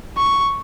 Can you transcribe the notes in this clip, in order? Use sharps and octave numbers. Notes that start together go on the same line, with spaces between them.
C#6